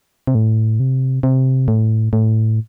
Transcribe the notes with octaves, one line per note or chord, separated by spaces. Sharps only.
C3
A2
C3
C3
A2
A2